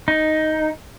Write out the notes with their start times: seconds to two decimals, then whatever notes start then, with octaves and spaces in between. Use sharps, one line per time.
0.08 D#4